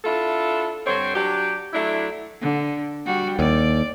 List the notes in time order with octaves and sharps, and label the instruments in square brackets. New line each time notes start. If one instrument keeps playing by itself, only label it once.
[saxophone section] D4 E4 F4 A4
G2 D3 C4 C5 C#5
F#3 D4 G4
F#3 A3 D4 E4
[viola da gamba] D3
G3 F#4
[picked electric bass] D#2 [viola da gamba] D5